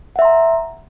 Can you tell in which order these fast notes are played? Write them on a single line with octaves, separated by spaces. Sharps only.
F#5 E5 C6 A#5